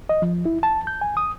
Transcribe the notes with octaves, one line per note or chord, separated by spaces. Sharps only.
D#5
F3
E4
A5
G6
G#5
D#6